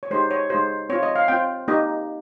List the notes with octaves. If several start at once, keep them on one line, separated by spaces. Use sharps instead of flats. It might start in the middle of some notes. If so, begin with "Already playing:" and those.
C#5
G#3 D#4 G4 C5
C#5
G#3 D#4 G4 C5
C4 F4 C#5
D#5
F5
C4 F4 G5
A#3 D#4 G4 D#5